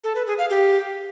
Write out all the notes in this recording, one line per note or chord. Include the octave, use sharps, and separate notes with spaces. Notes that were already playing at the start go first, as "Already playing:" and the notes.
A4
B4
G#4
F5
G4